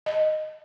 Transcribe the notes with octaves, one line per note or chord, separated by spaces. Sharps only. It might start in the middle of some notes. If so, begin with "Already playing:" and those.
D#5